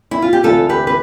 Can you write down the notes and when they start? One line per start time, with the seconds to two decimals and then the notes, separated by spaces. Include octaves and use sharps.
0.11 E4
0.22 F4
0.33 G4
0.43 D2 C3 E3 F4 A4
0.69 G4 B4
0.87 B4